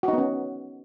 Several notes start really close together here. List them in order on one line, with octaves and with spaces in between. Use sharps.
F#4 D#4 B3 C#4